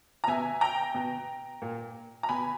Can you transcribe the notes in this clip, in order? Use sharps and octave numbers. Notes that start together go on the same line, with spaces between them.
A#5
B2 E5 G#5
G5 A#5
B2
A#2
A#5
B2 G#5 B5